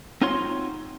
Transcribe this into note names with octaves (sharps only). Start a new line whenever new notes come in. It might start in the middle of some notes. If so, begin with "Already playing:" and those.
C4 D#4 F4 F#4 C#5 C6